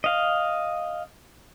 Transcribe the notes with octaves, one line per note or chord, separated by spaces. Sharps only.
D#5 F5